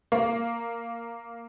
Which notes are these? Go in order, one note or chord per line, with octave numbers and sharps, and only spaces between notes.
A#3